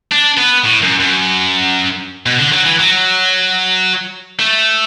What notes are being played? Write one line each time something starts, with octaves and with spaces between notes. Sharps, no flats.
D4
B3
A2
F#2
F#2
B2
D3
F#3
E3
F#3
A3